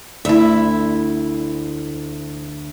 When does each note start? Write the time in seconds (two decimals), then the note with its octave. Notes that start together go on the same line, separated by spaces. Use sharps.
0.25 D2 E4 E5